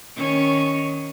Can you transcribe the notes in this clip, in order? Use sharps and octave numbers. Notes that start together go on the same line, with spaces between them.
D#3 C#4